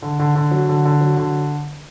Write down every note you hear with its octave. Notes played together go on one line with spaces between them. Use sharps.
D3
D3
D3
F#3
D3
D3
F#3
D3